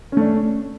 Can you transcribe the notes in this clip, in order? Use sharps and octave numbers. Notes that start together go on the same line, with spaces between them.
A3 C#4 D4